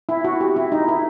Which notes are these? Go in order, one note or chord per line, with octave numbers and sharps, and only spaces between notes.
E4
F#4
G4
E4
D#4
E4